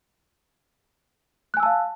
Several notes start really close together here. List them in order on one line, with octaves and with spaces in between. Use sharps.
F#6 G#5 E6 A5 F5